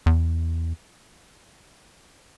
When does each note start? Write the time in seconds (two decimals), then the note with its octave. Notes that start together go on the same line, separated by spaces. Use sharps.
0.06 E2